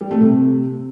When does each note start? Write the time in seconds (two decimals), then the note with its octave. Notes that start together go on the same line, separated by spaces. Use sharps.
0.01 G3
0.11 A3
0.21 C3